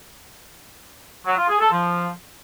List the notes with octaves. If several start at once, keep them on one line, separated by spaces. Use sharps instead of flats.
F#3
F4
G#4
A4
F3